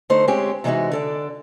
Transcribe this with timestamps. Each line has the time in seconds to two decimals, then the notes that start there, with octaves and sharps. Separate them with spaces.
0.10 D3 A3 D#4 C5
0.28 G#3 C4 C#4 G4
0.64 C3 E3 G#3 D4 D#4 F#4
0.91 D3 A4 D5